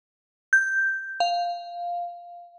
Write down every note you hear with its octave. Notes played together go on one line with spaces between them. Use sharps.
G6
F5